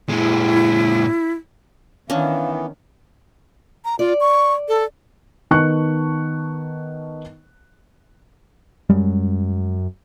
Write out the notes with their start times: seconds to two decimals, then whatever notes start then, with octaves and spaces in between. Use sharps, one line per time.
0.09 A#2 G#3 E4
2.10 D#3 E3 B3 C#4 D4 F5
3.85 A#5
3.99 F4 D5
4.20 C#6
4.68 A4
5.51 D#3 B3 A5 C#6 F#6 C#7
8.89 F#2 G3 G#3